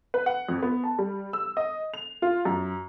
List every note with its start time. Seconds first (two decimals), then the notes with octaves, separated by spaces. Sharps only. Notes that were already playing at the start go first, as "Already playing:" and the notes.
0.14 B4
0.26 F#5
0.49 F2
0.62 B3
0.84 A5
0.99 G3
1.33 E6
1.57 D#5
1.94 F7
2.22 F4
2.45 F#2